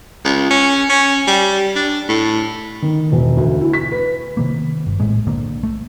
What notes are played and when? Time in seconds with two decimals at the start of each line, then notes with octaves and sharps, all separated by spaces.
0.25 C#2
0.50 C#4
0.89 C#4
1.27 G3
1.76 D4
2.09 A2
2.82 D#3
3.12 E1
3.37 D2
3.61 E4
3.73 B6
3.92 B4
4.37 C3 D#3 A#3
4.87 G1
5.00 A#1 A2 G#3
5.26 B1 D3 A#3
5.63 A3